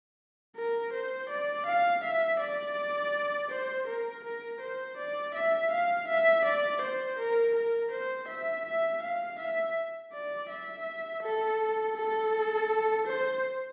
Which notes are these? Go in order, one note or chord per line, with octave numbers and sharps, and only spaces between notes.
A#4
C5
D5
F5
E5
D5
C5
A#4
A#4
C5
D5
E5
F5
E5
D5
C5
A#4
A#4
C5
E5
E5
F5
E5
D5
E5
A4
A4
C5